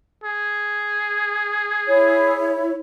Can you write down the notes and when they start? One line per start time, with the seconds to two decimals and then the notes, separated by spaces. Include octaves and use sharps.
0.24 G#4
1.87 E4 C#5